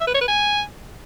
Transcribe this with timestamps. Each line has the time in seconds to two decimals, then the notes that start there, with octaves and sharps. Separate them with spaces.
0.01 E5
0.07 B4
0.14 C#5
0.21 B4
0.28 G#5